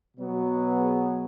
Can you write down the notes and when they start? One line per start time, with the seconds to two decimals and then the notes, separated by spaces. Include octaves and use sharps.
0.17 B2 F#3 B3
0.78 G#4